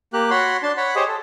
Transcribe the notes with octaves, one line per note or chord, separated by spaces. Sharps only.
A#3 G4 F#6
F#4 C#5 F#5 B5 C6
D4 A5 C6
C#5 F#5 B5
G4 G#4 C5 C#5 D#5
A4